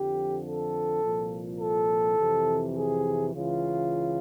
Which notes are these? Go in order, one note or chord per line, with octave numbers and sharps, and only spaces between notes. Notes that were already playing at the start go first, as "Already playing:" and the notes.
Already playing: F2 D3 F3 G4
A4
C2 A#2 F3
A4
F2 C3 E3
G#4
C#2 C#3 E3 F4